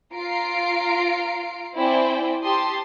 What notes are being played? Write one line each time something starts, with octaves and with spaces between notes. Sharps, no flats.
F4 A#5 C7 D7
C4 E4 C5 D5 G5 G#5
G4 A5 C6 D#6